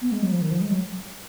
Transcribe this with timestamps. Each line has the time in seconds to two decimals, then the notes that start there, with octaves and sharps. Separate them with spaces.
0.02 B3
0.12 G#3
0.22 F#3
0.32 F3
0.42 D#3
0.51 F3
0.61 G#3
0.70 F#3